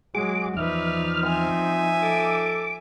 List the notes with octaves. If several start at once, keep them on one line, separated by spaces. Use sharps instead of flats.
F#3 G#3 F#4 G#4 D6
E2 F3 D#4 B4 D5 E5 F6
C4 E5 G#5
A4 D6